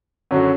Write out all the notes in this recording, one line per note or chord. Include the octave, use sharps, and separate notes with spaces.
F#2 D3 F#3 C#4 F#4